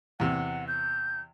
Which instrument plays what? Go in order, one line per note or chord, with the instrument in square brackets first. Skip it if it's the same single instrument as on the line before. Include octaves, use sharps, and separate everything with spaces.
[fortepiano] E2 C3 [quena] F#5
[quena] G6